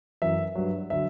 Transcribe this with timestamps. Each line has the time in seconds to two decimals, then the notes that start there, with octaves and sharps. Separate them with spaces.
0.22 F#2 E3 E5
0.55 G2 F#3
0.90 D3 F#3 E5